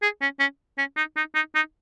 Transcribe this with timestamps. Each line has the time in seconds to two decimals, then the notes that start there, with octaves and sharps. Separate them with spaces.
0.02 G#4
0.21 C#4
0.40 C#4
0.78 C#4
0.97 D#4
1.16 D#4
1.35 D#4
1.55 D#4